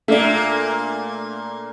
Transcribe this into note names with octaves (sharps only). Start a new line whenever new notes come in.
A#2 A3 A#3 D4